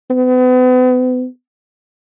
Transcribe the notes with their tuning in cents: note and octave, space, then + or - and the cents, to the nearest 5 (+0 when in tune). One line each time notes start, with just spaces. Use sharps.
B3 +40